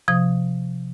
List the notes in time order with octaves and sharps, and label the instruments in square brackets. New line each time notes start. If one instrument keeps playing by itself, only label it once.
[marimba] C3 F3 D#6